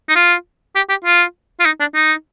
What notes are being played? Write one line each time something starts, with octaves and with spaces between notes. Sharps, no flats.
D#4
F4
G4
G4
F4
F4
D#4
D4
D#4